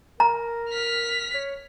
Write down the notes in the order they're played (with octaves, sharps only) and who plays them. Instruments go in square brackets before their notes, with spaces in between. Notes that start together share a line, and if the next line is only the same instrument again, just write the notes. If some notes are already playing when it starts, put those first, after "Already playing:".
[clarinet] A#4 [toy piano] A#5
[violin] F6 B6
[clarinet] C#5